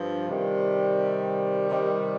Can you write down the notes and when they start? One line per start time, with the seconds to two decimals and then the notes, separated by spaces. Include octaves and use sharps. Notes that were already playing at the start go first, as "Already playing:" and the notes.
Already playing: G2 F3
0.29 C3 D#3 G3
1.69 C3 D#3 G3